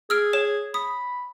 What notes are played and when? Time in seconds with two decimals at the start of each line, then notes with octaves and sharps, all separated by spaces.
0.10 G#4 E6 F6 D7
0.33 C#5 E7
0.74 B5 D#6